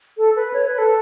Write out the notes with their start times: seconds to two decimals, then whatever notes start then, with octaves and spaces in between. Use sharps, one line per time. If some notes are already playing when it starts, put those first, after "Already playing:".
0.17 A4
0.36 B4
0.53 C#5
0.66 B4
0.78 A4